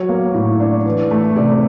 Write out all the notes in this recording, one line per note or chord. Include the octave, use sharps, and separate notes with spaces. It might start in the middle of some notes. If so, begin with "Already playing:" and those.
Already playing: F#3 C#5
A#3
A2
D4
E3
A3
C3 D5